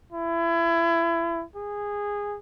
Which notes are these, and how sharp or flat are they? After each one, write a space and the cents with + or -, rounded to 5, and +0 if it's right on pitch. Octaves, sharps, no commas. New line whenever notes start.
E4 +30
G#4 -15